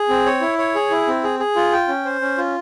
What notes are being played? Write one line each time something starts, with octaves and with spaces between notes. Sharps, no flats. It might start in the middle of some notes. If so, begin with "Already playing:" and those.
Already playing: G#4
C4
C#5
E4
C#5
G#4
E4
C4
G#4
G#4
F4
G5
C#4
C5
C#4
F4